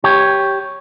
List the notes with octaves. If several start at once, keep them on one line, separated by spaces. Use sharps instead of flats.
G4 C#5